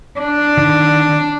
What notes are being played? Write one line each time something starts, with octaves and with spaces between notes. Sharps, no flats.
D4
D#3